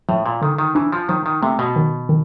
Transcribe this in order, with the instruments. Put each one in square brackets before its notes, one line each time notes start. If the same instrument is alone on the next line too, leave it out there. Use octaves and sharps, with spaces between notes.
[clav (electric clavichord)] A2 [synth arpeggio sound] F3
[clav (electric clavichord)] A#2
[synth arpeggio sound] D3 [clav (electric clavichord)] D#3
[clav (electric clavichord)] D#3
[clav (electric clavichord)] E3 [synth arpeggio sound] D4
[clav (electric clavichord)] F3
[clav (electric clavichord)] D#3 [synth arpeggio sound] F3
[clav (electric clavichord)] D#3
[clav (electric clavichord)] C3 [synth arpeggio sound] A3
[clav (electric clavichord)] B2
[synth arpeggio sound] D#3
D#3